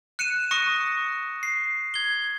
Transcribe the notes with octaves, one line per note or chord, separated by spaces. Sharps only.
F#6 C#7 D#7 E7
C#6 D#6 F#6 A#6 C#7
C7
G#6 G7